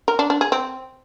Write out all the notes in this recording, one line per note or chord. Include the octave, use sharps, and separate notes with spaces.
A#4
D4
D4
G#4
C4